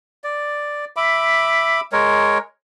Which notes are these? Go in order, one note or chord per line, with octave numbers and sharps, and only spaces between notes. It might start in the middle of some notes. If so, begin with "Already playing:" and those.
D5
E5 B5 D6
G#3 A#4 C#5